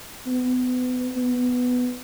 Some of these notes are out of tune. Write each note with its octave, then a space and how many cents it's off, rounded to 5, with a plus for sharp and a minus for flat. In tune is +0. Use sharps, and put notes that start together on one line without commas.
B3 +30
B3 +5